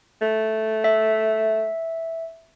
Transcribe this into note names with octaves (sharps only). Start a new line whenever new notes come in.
A3
E5